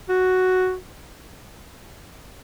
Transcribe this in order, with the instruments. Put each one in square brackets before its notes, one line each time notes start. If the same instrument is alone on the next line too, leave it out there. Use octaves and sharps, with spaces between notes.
[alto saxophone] F#4